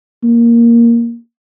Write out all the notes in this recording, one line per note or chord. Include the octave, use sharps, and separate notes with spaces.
A#3